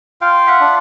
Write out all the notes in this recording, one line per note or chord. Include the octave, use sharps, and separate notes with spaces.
F4 F5 G5
E5 F#5
D4